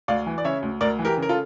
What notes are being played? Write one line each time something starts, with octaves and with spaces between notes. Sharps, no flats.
D2 D5 F5
E3
D5
C#3 C#5 E5
D2
D2 A#4 D5
E3
G4 A#4
C#3
A#4
F4 A4